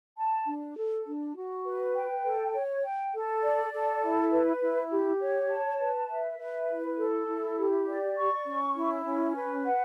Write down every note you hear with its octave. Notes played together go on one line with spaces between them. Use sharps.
A5
D4
A4
D4
F#4
B4
G5
A4
C#5
G5
A4
D5
A4
E4
B4
E4
G4
C#5
A5
B4
E5
B4
E4
A4
E4
G4
D5
C#6
C#4
E4
C#4
B4
F#5